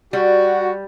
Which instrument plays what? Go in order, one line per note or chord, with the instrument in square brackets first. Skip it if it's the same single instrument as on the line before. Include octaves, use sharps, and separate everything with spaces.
[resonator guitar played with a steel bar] G3 [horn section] F#4